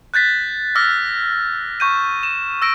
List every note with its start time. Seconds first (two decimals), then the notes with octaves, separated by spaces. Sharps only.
0.14 F#6 G6 A6 B6
0.75 D6 E6 F6 A#6
1.80 C#6 G6 D#7
2.23 E7
2.62 E6 A#6 D7